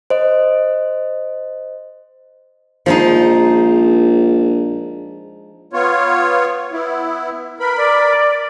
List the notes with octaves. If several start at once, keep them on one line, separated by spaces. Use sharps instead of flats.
C5 D#5
A#1 F3 G#3 D#4
B3 F4 C#5
B3 E4
A#4 B4 B5
D5